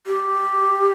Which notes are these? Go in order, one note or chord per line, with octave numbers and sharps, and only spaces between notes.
G4